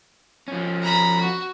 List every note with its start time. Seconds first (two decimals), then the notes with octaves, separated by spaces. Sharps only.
0.48 F3 C#4
0.82 A#5 B5
1.20 F#4